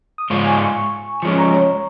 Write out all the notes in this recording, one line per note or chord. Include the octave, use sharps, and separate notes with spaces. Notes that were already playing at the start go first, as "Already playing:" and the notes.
D#6
G#2 G#3 F4 C#6
G#5
C#6
F3 G#3 C#4 C#6
A#5
C#5